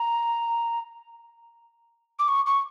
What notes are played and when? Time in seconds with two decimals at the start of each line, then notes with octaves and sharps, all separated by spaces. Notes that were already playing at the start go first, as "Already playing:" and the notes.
Already playing: A#5
2.19 D6
2.28 C#6
2.46 C#6